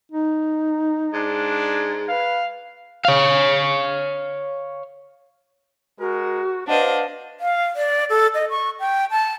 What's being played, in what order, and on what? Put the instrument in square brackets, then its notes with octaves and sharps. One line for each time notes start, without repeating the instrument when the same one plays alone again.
[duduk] D#4
[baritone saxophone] G#2 [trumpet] D4
[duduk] B4 [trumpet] F5
[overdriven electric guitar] C#5 F5
[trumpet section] G#3 A#4 [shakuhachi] F#4
[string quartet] D4 D#5 [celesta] B4 F#5 [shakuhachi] C5 [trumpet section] D5 F5
[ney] F5
D5
A4
D#5
C#6
G5
A5